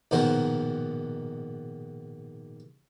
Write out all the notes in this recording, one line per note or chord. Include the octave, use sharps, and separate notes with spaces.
A#1 G#2 B2 D#3 F#4 C5